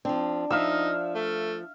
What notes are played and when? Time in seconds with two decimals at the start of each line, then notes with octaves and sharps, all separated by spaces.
0.05 F3 C4 D4
0.50 F3 D#4 E5 F5 E6
1.15 A3